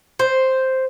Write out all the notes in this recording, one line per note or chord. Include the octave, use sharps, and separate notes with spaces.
C5